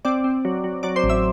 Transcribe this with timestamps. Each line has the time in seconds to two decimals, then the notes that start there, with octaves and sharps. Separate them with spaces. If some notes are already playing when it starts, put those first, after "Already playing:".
0.05 C4 D5 D6
0.24 C4
0.45 F#3
0.64 F#3
0.83 F#3 D5 D6
0.96 C5 C6
1.04 A1
1.09 E5 E6